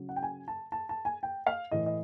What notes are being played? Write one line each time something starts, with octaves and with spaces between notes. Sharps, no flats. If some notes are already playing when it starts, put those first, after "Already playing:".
Already playing: C#3 F#3
F#5
G5
G#5
A5
A5
A5
G#5
G5
F5
A2 E3 D#5
D#5